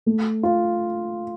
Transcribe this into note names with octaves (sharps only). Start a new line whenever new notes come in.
A3
F4